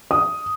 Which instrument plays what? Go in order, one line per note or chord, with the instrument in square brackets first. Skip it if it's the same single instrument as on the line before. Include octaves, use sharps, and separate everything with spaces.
[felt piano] D#6